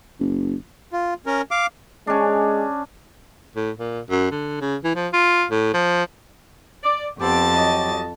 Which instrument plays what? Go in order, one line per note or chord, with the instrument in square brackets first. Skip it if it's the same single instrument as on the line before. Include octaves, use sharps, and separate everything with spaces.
[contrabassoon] F#1
[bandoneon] F4
C#4 A#4
F5 D6
[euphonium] G#3 [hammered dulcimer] C#4 D4
[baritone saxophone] A2
A#2
F#2
D3
C#3
E3
F3
F4
A2
F3
[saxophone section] D5
[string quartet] F2 A5 A6 [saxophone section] B3 C4 G4
[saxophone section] F#3 G4 D#5